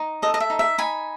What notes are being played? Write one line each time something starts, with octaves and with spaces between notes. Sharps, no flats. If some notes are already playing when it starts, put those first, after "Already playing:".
Already playing: D#4
A4 D#5
D#5
E5
D#4
E5
D#4 G#5 B5